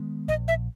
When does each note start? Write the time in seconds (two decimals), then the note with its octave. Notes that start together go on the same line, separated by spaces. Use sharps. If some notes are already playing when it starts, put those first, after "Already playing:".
Already playing: D#3 G#3 B3
0.28 A#1 D#5
0.48 E5